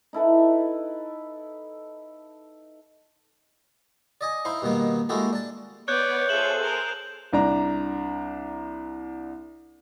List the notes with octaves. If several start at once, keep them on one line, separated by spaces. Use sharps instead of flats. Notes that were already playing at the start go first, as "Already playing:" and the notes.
D#4 E4 A4 B4
D5 D#5 G#5
D#4 E4 C5 F5
G2 B2 D#3 A#3 B3
G#3 A#3 E4 F#4 G4 A4
D4 A5
B3 B4 C#5 D5 F#6 G6
F4 G#4 A4 C5 E5 E7 F#7
A#4
C2 D4 A#5